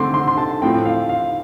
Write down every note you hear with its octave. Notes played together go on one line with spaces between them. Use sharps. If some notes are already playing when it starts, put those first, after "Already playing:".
Already playing: D3 A3 C4 C6 D6
C6
C6
A5
A2 F3 A3 C4 G5
F5
F5